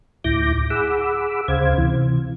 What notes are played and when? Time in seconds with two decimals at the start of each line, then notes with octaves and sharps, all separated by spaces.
0.24 D2 A2 E4 D6 G6 A#6
0.70 G#4 F#5 B5 D6 E6
1.48 D2 C#3 C5 F5 G#6
1.78 C3 E3